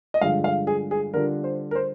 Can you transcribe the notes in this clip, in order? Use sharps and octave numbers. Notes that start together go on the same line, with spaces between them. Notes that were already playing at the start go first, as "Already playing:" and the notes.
D#5
G2 D3 F3 G#3 F5
F5
G#4
G#4
D3 G3 D4 F4 A#4
C5
A#4
C5